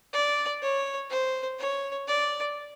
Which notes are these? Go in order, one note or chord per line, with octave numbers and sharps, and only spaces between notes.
D5
C#5
C5
C#5
D5